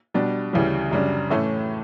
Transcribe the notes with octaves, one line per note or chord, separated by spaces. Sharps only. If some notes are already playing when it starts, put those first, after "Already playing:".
B2 G3 D4
D2 C#3 E3 G3
F#2 C#3 G3 D4
A2 E3 A3 C#4